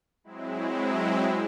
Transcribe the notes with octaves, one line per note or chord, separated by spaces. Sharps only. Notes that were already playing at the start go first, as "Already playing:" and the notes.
F#3 G#3 C4 E4